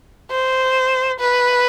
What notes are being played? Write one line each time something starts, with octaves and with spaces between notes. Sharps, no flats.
C5
B4